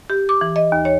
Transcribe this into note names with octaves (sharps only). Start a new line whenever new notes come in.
G4
D6
E3
D#5
D#2
C#5